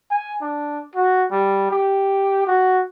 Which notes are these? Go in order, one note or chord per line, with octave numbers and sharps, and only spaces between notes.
G#5
D4
F#4
G3
G4
F#4